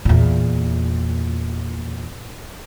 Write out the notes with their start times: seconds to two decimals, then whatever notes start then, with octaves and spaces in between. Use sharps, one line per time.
0.05 E2 A#2